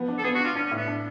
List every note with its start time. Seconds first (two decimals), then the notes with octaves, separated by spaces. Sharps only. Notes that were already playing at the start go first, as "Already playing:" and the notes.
Already playing: F3 B3
0.08 D4
0.19 A4
0.24 B3 G#4
0.35 F#4
0.40 D4
0.45 F4
0.55 C#4 D4
0.66 C#4
0.71 A2
0.77 B3
0.87 D4